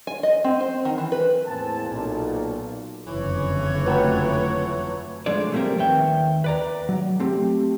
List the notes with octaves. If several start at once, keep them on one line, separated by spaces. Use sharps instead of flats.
G#5
D#5
C4
C5
D#3
E3
B4
E2 A2 A#3 C4 G#5 A5
B1 A#2
F#1 F2 D3 E3 C#5
F#3 A3 F4 B4 G5 A5
F3 G#3 A3 D4 C#5 D5
F3 G3 A3 A#3 C4 A#4
D#2 B4 C#5 E5 G5
B4 D5 A#5
F#3
A3 C4 G4